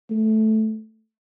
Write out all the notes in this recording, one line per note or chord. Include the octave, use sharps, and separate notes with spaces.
A3